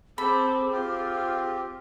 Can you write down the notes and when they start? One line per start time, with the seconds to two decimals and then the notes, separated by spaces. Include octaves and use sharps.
0.18 C4 G#4 A4 B5 D6
0.72 C4 F4 G4